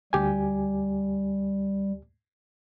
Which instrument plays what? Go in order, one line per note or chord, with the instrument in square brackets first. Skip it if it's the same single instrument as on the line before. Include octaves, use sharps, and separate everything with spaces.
[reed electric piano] D2 G4 G#5 [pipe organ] G3